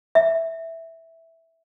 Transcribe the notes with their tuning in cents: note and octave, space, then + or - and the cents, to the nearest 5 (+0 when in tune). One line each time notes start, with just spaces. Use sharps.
E5 -5